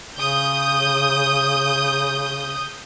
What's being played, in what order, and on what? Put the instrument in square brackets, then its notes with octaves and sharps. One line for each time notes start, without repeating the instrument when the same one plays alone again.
[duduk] C#3 [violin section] D#6 G6